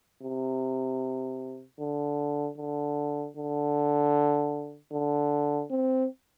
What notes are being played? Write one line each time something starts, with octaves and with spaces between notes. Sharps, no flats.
C3
D3
D3
D3
D3
C4